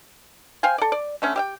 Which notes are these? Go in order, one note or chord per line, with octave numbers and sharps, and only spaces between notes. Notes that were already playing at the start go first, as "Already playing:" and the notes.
C5 F5 G5 G#5
A4 D5
D5
D3 A3 C#4
G4 E5 G5